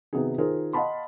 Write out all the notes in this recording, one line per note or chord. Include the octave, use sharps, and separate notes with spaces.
C3 D#3 B3 D#4 F#4 G#4
D#3 D#4 F4 G#4 A#4 C5
D#5 F5 F#5 A5 B5 C6